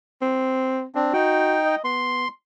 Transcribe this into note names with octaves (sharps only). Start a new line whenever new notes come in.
C4
C4 D4
D#4 F#4 G5
D#5
B3 C6